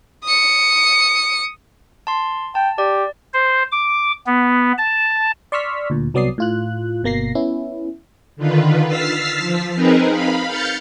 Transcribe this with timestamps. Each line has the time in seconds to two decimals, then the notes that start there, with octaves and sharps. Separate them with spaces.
0.24 D#6 C#7
2.07 A5 C6
2.55 G5 A5
2.78 G4 D5
3.34 C5
3.72 D6
4.27 B3
4.78 A5
5.52 D5 C6 C#6 E6 F6 B6
5.90 D2 A#2
6.14 C2 F#3 B3 D5 D#6 C7
6.38 A2 F4 F#6
7.03 G1 B2 A#3 A#6 C7
7.35 B3 C#4 E4
8.36 D3 D#3 F4 B4
8.88 E6 F6 A6 B6 C7
9.37 F3
9.75 C4 D#4 G#4 A#4 B4
10.09 F5 B5
10.47 F6 G6 A6 C#7